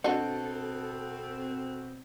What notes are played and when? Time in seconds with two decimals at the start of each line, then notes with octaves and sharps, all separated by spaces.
0.04 B2 C4 D4 F#4 A4 D#5